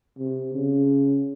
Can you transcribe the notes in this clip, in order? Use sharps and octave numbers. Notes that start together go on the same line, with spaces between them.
C3
C#3